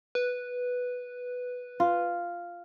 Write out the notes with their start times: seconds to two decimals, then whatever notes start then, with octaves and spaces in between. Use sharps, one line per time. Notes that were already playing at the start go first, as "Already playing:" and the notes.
0.15 B4
1.80 F4